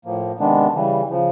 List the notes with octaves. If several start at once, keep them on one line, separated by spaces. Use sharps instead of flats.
A2 F3 A#3
C3 D#3 G#3 B3 D4
C#3 E3 G3
C#3 F3